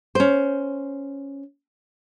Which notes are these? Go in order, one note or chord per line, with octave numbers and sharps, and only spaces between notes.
C#4 C5